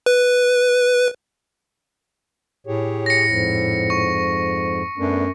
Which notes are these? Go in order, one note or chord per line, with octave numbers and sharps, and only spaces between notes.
B4
A2 G4 G#4 C#5
A#6 C#7
F2 G#2
C#6
F#2 A3 B3 D4